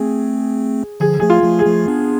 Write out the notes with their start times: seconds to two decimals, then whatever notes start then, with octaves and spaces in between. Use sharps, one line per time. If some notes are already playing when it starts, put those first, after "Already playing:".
Already playing: A3 C4 G#4
1.00 D3 F3 G#4
1.20 F3 A3 G#4
1.30 F4
1.44 F3 A3
1.59 G#4
1.66 F3 A3
1.88 B3 D4